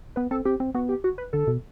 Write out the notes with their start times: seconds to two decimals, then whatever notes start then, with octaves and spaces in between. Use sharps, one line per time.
0.16 B3 B4
0.31 C4 A4
0.45 C4 G4
0.60 C4
0.75 B3 F#4
0.89 G4
1.04 F#4
1.18 B4
1.33 D3 A4
1.47 B2